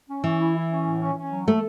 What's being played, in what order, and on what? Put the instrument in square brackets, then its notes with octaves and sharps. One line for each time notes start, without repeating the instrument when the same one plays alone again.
[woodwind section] C#4
[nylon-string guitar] E3 [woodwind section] C#4
[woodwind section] E4
E4
C#4
A2
C#4
C#4
F#3
[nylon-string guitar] A3 [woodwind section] A4